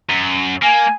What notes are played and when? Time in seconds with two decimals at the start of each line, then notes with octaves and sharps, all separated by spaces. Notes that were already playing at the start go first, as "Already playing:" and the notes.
0.10 F#2
0.63 A#3 G#5